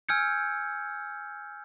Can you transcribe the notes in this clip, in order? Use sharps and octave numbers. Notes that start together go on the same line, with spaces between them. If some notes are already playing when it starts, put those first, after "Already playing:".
G#5 E6 F6 G6 G#6 C#7